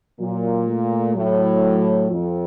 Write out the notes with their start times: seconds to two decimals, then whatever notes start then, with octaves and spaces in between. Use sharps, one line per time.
0.20 A#2 F#3
0.68 A3
1.15 A2 F#3
2.10 F2 F3